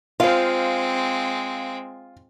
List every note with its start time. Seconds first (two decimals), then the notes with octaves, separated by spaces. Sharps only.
0.20 G#3 C4 F4 C5 F5